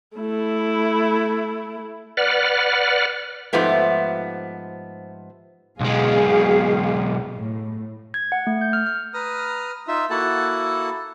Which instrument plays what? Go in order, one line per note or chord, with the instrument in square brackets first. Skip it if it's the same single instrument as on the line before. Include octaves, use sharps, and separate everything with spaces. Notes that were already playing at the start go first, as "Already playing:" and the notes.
[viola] A3 E4
[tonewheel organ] B4 D5 F#5 F6
[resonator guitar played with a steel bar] G#2 F3 A3 B3 G4
[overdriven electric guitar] B1 G#3 [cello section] B2 G#4 F5
[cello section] A2
[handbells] G#6
F#5
A3
G6
F6
F6
[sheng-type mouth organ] B4 A#5 D#6 F6
D#4 F4 E5
A#3 E4 F#4 A4 F#5 A5